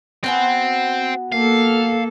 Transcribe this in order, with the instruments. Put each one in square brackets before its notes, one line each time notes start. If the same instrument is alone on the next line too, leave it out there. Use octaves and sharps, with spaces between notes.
[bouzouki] B3 F#4 G#5 [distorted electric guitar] C4
[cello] A#3 A4 [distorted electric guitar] F5